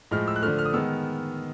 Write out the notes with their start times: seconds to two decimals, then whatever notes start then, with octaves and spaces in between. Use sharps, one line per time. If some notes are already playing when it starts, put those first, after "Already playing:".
0.11 A2 F3 G#3 F6
0.28 E6
0.36 F#6
0.42 D3 F3 A3 F6
0.59 F6
0.65 D#6
0.73 D#3 G#3 B3 E6